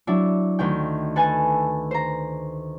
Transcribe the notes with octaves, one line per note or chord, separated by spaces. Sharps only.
F#3 D4 E4
D2 D#3 G5
A4 B4 G#5 A5
C5 A#5